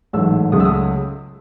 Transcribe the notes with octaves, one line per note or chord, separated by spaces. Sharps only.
A1 G#2 F#3 A3 E6
C#2 C#3 F#3 A3 D#6
E6
D#6